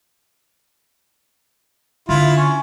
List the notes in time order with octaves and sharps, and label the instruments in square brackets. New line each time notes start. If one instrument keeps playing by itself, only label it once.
[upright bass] D3 [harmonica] E4 F4
[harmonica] C#4